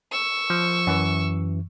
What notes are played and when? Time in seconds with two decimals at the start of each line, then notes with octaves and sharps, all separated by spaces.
0.12 C#6 E6
0.50 F3
0.87 F#2 E3